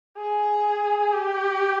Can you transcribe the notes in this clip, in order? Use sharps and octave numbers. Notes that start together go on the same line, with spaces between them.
G#4
G4